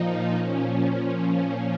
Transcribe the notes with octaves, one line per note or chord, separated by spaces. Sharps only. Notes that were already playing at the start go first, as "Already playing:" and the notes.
Already playing: A#2 F3 D#4
A#2 F3 C#4
A#2 F3